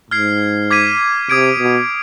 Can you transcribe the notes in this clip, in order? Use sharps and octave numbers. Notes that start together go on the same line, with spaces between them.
G#2 F6 G#6 C7
D6 G#6 B6 D#7
C3 D#6 G#6 D7
B2